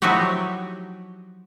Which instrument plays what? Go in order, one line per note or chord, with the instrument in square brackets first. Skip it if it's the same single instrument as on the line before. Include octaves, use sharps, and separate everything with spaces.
[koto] F3 F#3 D#4 E4 F#4 G4